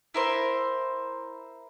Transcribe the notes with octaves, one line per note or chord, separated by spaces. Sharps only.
E4 A#4 C5